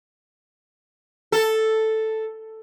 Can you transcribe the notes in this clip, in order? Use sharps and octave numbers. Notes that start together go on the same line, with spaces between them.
A4